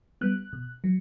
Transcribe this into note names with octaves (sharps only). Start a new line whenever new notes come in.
G3 B3 F#6
B2
F#3